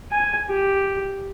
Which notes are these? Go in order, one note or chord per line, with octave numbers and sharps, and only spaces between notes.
G#5
G4